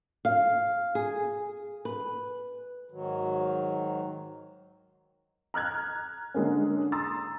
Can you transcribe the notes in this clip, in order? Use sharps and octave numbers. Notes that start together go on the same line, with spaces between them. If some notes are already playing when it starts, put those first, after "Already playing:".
F5
G#4
B4
G#2 D#3 F#3
A#5 F6 F#6 G#6
D3 G#3 A#3 C#4
A#5 C6 D#6 E6 A6